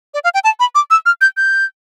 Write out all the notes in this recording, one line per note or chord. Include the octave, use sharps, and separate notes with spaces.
D5
F5
G5
A5
B5
D6
E6
F6
G6
G6